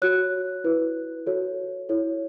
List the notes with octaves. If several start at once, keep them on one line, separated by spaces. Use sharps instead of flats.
F#4 C#5 F#6
E4 B4
F#4 A4 C#5
E4 A4 C#5